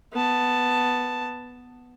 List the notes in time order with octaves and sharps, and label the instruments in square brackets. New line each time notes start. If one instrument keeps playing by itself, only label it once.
[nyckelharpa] B3 A5